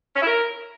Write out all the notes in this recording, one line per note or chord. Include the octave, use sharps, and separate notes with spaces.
C#4
E4
A#4